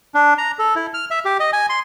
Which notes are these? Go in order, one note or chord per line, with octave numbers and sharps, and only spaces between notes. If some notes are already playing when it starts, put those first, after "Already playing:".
D4
A#5
A4
E4
F6
E5
G4
D#5
G#5
C6